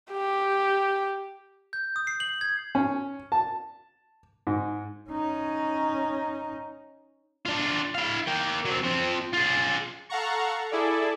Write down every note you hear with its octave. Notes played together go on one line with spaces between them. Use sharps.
G4
G6
D#6
C7
F#7
G#6
C#4
A5
G#2
C#4 D#4
D4 F4
E4 F5
A#3 G5
F#3 C4
F3 C4
F4 G#4
A4 F5 F#5 A#5 C#6
E4 G#4 A4 D5